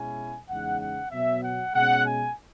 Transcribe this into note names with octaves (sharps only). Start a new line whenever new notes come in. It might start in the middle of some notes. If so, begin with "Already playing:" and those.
Already playing: B2 G#3 C#4 E4 G#5
E2 C#3 G#3 D#4 F#5
F#5
B2 F#3 B3 E5
F#5
B2 G#3 C#4 F#5
G#5